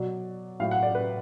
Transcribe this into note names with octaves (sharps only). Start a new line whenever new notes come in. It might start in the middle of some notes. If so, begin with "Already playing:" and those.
Already playing: B2 F#3 D5
A2 F#3 F5
F#5
D5
B4